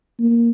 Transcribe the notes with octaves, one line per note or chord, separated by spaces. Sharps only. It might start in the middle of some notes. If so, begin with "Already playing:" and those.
A#3